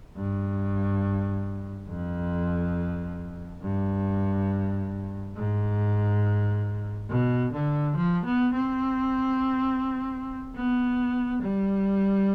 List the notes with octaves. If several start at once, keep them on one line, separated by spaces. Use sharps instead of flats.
G2
F2
G2
G#2
B2
D3
F3
B3
C4
B3
G3